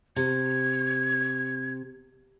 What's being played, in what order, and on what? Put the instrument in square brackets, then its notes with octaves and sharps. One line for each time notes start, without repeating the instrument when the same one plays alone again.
[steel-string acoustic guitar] C3 [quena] G#6